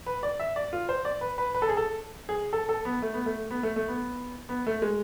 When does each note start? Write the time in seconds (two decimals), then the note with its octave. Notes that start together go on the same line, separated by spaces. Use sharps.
0.06 B4
0.23 D5
0.39 E5
0.56 D5
0.73 F4
0.89 C5
1.05 D5
1.21 B4
1.38 B4
1.55 B4
1.62 A4
1.69 G#4
1.77 A4
2.29 G#4
2.53 A4
2.69 A4
2.85 B3
3.02 A3
3.14 B3
3.26 A3
3.51 B3
3.63 A3
3.76 A3
3.88 B3
4.49 B3
4.67 A3
4.82 G#3